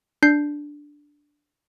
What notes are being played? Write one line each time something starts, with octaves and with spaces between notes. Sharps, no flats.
D4 G6 C7